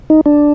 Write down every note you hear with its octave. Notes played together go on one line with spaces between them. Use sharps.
D#4
D4